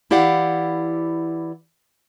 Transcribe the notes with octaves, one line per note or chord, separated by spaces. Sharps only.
E3 E4 G4 D5 F5 F#5